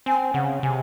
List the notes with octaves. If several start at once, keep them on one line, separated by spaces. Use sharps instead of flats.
C4 G#5
C#3 F#5
C3 G#5